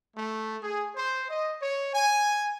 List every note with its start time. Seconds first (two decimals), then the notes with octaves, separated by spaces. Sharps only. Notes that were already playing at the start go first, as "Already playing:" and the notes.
0.15 A3
0.62 G#4
0.96 C5
1.29 D#5
1.61 C#5
1.94 G#5